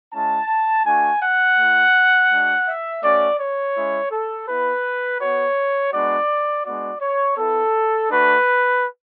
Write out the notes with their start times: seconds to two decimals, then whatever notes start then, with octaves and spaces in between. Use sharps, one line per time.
0.14 G#3 C#4 E4 A5
0.86 A3 D4 F#4 G#5
1.23 F#5
1.58 A3 E4
2.31 G#3 D4 F#4
2.66 E5
3.03 A3 C#4 F#4 D5
3.40 C#5
3.76 G#3 C#4 E4
4.12 A4
4.48 B3 E4 B4
5.20 B3 F#4 C#5
5.93 G#3 B3 D4 F#4 D5
6.66 G#3 B3 D4 F#4 D5
7.02 C#5
7.37 B3 E4 A4
8.10 A3 D4 F#4 B4